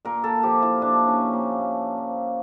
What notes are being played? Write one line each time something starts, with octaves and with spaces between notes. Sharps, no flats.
A#2 A#4
A4
F3 G4
E4
A#2 D4
C#4
F3
A#3
A#2
F3